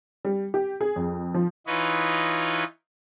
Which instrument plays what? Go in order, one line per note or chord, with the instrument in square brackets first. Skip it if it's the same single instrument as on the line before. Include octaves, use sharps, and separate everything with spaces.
[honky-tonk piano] G3
G4
G#4
F2
F3
[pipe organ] E3 D#4 F4 B4 C#5 D#5